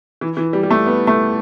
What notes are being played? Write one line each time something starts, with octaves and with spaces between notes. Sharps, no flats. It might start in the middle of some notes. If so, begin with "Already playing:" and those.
E3
E3
G3
G3
A3
B3
A3